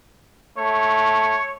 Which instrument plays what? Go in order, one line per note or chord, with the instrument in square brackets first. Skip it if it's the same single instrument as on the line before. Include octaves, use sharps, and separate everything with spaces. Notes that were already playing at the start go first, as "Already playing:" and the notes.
[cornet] A3 [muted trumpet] C#5